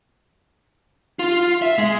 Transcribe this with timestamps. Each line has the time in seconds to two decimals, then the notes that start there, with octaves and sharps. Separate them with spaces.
1.19 F4
1.62 E5
1.78 G#3